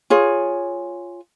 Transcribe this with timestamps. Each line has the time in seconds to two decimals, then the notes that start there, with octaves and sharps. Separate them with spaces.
0.10 F4 G#4 C#5